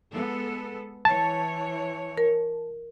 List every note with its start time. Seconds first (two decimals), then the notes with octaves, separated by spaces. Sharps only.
0.10 G#3 B3 A4
1.05 E3 C#5 A5
2.18 A#4